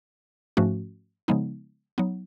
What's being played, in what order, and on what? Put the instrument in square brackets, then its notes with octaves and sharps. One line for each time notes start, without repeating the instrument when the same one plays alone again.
[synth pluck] G#2 F3 A3 C#4 F#4
C#3 F3 G#3 B3 D#4
F#3 B3 D#4